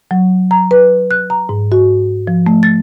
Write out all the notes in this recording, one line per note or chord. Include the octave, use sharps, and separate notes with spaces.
F#3
A#5
B4
F#6
A#5
G#2
F#4
F3
A3
A6